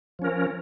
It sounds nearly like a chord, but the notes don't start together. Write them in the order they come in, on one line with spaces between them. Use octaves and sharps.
F3 C#4 A#4